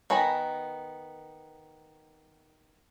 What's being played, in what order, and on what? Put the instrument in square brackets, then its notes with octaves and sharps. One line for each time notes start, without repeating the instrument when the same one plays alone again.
[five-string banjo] D#3 B3 G#5 A#5 B5